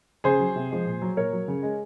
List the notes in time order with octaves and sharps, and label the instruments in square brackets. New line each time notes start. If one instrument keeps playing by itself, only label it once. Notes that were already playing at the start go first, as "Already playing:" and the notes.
[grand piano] C#3 G#4 C5
F#3
C3
F3 G#3
A#2
F#3
A#2 A#4 C#5
F#3
C#3
G#3